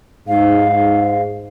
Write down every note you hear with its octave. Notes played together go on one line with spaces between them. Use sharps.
G#2 F5